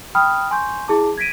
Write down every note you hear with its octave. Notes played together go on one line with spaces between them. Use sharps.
G5 B5 D#6 F6
G#5 C6 C#6 G6
E4 G#4 A5 D6
G#6 A#6 B6 D7 D#7